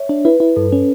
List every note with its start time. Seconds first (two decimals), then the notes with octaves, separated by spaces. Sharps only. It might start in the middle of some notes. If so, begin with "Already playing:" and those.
Already playing: C#5 E5
0.09 D4
0.25 E4 B4
0.40 E4
0.56 G2 A4
0.72 C#4